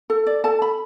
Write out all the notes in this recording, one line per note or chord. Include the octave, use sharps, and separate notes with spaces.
A4
D5
A4 A5
B5